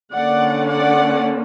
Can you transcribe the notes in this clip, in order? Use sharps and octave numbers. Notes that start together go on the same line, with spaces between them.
D3 A#3 C#4 D5 F#5
D5 F#5